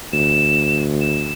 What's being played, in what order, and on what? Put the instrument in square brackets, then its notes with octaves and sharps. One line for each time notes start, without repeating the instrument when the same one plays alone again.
[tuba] D2 [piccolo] E7
[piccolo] E7